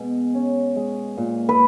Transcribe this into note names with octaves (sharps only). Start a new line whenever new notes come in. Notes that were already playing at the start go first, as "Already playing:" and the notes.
Already playing: B2 G#3
C#4
G#3
A#2
B4